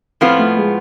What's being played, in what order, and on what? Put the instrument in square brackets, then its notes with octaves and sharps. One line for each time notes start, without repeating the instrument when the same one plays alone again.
[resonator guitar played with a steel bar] A2 F3 B3 F4 [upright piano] C4
[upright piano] A3
G#3